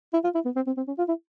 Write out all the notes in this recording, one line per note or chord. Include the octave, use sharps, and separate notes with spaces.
E4
F4
E4
B3
C4
C4
C4
C#4
F4
E4